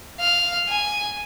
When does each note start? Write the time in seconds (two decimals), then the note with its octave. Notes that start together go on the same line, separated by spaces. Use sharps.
0.20 F5
0.69 G#5